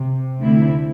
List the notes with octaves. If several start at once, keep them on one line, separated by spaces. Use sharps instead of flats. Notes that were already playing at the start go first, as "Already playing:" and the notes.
Already playing: C3
D2 D3 A3 C4 E4